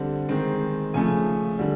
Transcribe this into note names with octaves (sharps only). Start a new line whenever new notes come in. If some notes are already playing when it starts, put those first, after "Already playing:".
Already playing: D3 G3 C4
D#3 G#3 C4
C#3 F3 A3 G#5
D3 G3